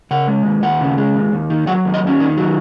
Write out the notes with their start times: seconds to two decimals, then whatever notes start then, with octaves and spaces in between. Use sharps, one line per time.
0.11 C#3 F#5
0.28 G#3
0.46 D#2
0.62 D#2 F#5
0.81 C#3
0.98 G#3
1.15 D#2
1.32 D#2
1.50 D#3
1.67 F#3 F#5
1.85 D#2
1.94 D#5
2.03 D#2 C#4
2.20 D#3
2.37 F#3